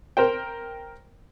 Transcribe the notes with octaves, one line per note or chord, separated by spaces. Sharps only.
A#4 C5 G5